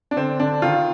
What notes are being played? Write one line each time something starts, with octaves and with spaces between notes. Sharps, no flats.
D4
D3 C4
D3 D4
D#3 F4